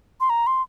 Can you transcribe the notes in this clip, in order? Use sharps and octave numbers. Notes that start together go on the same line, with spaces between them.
C6
A#5
C6